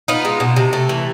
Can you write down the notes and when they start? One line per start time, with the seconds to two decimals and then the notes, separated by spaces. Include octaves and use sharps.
0.08 B3 D#4 F4
0.25 G#3
0.40 B2
0.56 C3
0.73 A3
0.89 E3